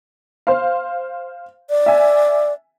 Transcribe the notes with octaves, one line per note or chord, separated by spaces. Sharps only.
C5 F5
D5
E5 G#5